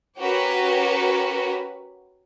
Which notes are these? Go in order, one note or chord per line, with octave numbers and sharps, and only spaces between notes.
C#4 F#4 G4 A#4 B4